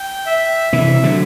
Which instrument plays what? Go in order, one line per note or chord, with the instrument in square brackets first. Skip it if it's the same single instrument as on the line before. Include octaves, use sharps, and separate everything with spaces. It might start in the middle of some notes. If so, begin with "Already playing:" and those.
Already playing: [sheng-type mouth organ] G5
E5
[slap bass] C3 E3 [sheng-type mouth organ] E5
[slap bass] D3 F#3